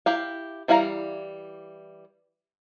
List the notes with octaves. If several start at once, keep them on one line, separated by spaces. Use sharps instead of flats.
E4 G4 F5
E3 G3 E4 F5 A#5